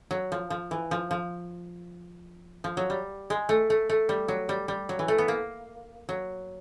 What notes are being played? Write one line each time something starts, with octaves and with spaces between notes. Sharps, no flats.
F#3
F3
F3
E3
F3
F3
F3
F#3
G3
G#3
A3
A3
A3
G3
F#3
G3
G3
F#3
E3
A3
B3
A#3
F#3